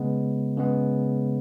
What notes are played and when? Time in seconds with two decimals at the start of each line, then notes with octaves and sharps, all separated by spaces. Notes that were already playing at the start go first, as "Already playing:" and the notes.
Already playing: C#3 G#3 B3
0.57 C#3 G#3 B3